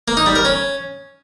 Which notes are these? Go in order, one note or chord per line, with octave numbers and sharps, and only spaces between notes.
A#3
D#4
G3
A#4
C#4